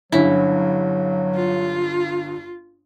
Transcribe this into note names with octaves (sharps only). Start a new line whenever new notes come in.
G1 G2 F#3 C#4 E4
F4